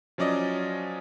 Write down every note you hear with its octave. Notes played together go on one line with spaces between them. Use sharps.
F3 F#3 C#4 D5 D#5